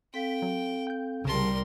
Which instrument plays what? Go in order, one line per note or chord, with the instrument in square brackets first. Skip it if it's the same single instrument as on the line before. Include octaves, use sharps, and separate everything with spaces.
[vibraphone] C4 A4 F5 [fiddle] G5 [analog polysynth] B6
[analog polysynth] F#3
G5 G6
[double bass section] C2 G3 [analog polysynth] C#3 A5 [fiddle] A#4 C6